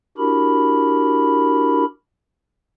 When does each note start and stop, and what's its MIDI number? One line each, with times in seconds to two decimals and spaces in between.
0.18 1.85 62
0.18 1.85 64
0.18 1.85 66
0.18 1.85 67
0.18 1.85 70
0.18 1.85 83